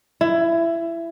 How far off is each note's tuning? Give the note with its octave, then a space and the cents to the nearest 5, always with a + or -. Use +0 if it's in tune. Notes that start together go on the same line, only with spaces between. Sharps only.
E4 +20